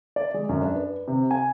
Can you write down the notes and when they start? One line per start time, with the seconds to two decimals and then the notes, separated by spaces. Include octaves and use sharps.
0.16 D5
0.34 G#3
0.49 F#2
0.61 D4
0.76 B4
1.08 C3
1.31 G#5